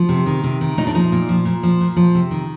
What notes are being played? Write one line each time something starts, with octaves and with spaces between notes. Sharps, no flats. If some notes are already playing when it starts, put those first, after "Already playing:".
Already playing: F3
C3
D#3
C3
D#3
A#2 D#4
D4
F3 D#4
A#2
F3
A#2
F3
A#2
F3
C3
D#3